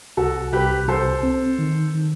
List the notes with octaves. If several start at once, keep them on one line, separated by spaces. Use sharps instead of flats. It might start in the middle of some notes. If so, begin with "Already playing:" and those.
C2 F#4 A4
C2 G4 B4
C2 A4 C5
C4
D#3
D#3